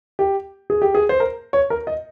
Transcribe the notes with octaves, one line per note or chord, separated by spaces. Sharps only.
G4
G#4
G4
G#4
C5
A#4
C#5
A#4
D#5